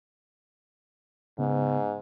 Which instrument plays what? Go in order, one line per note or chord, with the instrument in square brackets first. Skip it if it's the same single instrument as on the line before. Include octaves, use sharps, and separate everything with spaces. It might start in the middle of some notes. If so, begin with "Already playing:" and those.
[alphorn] G#2 [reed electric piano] C#3 B3